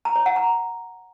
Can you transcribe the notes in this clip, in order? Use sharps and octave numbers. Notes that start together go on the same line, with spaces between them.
A#5
C#5
F#5
A#5